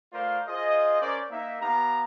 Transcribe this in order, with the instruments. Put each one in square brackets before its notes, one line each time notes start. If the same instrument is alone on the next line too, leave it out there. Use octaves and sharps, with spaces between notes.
[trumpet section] A3 F4 A#4 C5 D5 F5
F4 G#4 C5 D#5
C#4 A#4 C5 D5
A#3 D#4 E5
B3 G4 F5 A#5